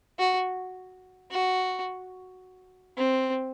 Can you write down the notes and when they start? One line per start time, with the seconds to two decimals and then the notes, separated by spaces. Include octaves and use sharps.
0.19 F#4
1.31 F#4
2.98 C4